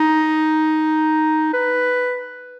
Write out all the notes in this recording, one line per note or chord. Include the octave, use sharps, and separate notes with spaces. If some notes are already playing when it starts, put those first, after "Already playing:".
Already playing: D#4
B4